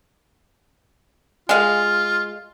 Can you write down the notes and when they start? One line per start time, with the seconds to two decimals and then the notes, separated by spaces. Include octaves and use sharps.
1.49 G#3 F4 G#4 F5